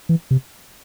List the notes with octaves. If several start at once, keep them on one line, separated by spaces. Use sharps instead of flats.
E3
C3